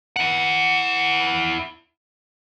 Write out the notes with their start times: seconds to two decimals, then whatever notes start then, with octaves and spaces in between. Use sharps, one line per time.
0.16 E4 F#5